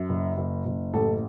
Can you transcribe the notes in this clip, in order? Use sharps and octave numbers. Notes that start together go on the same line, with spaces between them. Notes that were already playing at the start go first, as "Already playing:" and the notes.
Already playing: F#2
F#1
F#1
F#1
A1 A4